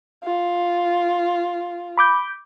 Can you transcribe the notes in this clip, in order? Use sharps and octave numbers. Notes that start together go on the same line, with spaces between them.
F4
B5 D6 G6